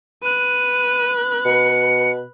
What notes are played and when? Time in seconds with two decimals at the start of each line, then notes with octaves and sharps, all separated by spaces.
0.23 B4 F#6 D#7
1.45 B2 C#7